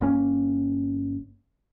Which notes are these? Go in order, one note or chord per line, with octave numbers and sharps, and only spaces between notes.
G1 A#3 C#4